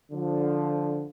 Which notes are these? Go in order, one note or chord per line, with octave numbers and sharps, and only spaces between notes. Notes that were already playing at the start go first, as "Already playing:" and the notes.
D3 F3